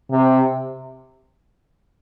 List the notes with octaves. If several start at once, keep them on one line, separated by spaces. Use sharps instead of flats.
C3